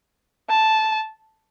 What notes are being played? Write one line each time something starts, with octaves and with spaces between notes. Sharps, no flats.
A5